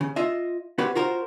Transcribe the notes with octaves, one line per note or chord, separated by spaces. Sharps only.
C#3
F4 D#5 E5
C4 F#4 G4 B4 C#5
F4 F#4 A#4 C5